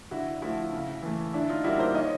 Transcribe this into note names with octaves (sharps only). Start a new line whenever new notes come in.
D3 E4 F#4
F3 A3 E4 F#4
C#3
E3 A3
D3 D4 E4
D#4 F4
G3 A#3 E4 F#4
A#4 C5
D#3 C#5 D#5